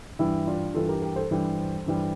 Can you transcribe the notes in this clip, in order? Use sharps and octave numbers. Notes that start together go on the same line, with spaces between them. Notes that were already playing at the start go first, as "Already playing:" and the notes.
G2 E3 G3 E4
D4 F4
G2 E3 G3 F4 A4
G4 A#4
G4 A#4
A4 C5
G2 E3 G3
G2 E3 G3